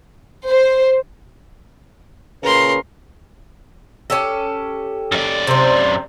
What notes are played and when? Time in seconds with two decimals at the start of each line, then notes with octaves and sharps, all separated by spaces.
0.48 C5
2.43 A#2 C#3 A#4 B4 C6
4.10 C#4 G4 A4
5.12 F#2 D5
5.47 C3 C5